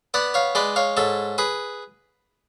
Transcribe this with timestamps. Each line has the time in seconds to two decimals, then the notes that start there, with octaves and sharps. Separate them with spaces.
0.14 B3 D5 F#5
0.34 C#5 F5
0.55 G#3 B4 D5
0.76 C#5 F5
0.97 G#2 A4 C#5
1.38 G#4 B4